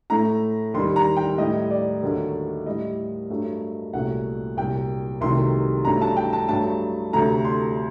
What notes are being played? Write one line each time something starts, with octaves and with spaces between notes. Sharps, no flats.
A2 A3 A#5
D#2 D#3 G3 C6
A#5
G5
A2 G3 D#5
D5
D#2 D3 F#3 A3
A2 G3 D#5
G2 F#3 A3
C2 A#2 F#3 A3 F#5
C2 A#2 F#3 G5
C2 C3 D#3 F#3 A3 C6
G2 F#3 A3 A#5
A5
G5
A5
G2 F#3 A3 A5
D2 C3 F#3 A3 A#5
C6